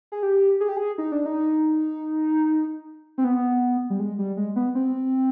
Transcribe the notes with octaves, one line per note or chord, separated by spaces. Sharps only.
G#4
G4
G#4
G4
G#4
D#4
D4
D#4
C4
B3
G3
G#3
G3
G#3
B3
C4